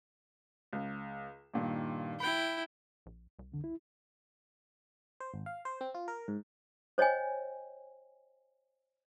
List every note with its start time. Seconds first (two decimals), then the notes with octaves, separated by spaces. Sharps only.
0.73 C#2
1.54 G2 A#2 D#3
2.20 E4 G5 B5
3.06 A#1
3.39 C2
3.52 F2 D3
3.64 E4
5.20 C5
5.34 G#1
5.46 F5
5.65 C5
5.81 C4
5.94 F4
6.08 A#4
6.28 G#2
6.98 C5 C#5 D#5 G5 G#5